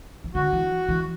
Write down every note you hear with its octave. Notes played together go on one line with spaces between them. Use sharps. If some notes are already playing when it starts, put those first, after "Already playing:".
E3
D3 F#4
E3
E3